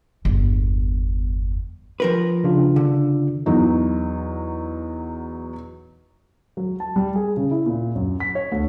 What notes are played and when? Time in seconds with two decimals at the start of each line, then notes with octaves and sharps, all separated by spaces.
0.25 G1 E2
2.00 F3 A#4 B4
2.44 C#3 D4 F4
2.76 D3
3.46 E2 F#3 D#4
6.57 F#3
6.80 A5
6.96 G3
7.16 G#4
7.37 C#3
7.51 E4
7.66 A#2
7.95 F#2
8.20 B6
8.35 C#5
8.52 D2